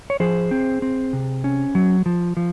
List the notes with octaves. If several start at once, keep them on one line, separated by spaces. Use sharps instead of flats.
C#5
F3 G#4 C5
C4
C4
C3
C#4
F#3
F3
F3